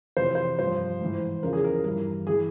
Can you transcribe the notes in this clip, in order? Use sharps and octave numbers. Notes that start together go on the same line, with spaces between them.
F2 C3 E3 C5
C5
G2 F3 C5
G#2 E3
E2 C#3 F3 A#4
G#4
A#4
G2 E3 A#4
E3 G#4